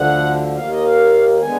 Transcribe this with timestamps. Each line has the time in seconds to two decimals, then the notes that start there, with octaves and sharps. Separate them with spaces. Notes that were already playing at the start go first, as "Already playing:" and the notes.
Already playing: D2 D3 F3 F#5
0.56 D#2 D#3 A#3 F5
0.70 D#5
0.83 F5
1.42 D3 G#3 B3 G#5